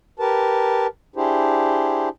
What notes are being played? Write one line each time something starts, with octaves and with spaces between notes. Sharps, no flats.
G4 A#4 B4 A5
D4 E4 G4 G#4 C5